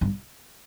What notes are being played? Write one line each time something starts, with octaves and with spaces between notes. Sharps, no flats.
G2